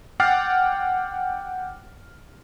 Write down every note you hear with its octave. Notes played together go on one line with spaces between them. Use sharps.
F#5 G5 D6 F6 A6 C7